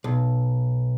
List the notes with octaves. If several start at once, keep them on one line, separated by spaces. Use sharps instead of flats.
B1